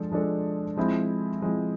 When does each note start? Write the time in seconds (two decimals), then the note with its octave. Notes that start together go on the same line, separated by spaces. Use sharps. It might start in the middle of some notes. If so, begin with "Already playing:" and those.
Already playing: F3 G#3 D4 A4
0.11 F3 G#3 D4 A4
0.77 F3 G#3 C4 E4
1.42 F3 G#3 C4 E4